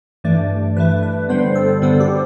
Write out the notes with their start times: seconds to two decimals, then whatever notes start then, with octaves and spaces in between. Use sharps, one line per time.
0.24 G2 E3 A3 D5
0.76 G2 E3 A3 B4
1.03 B4
1.29 G2 D3 G3 B3 C5
1.55 A4
1.82 G2 D3 G3 B3 A4
2.00 G4